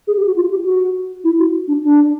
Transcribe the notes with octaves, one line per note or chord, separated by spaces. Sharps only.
G#4
G4
F#4
F4
G4
F#4
E4
F#4
D4
D4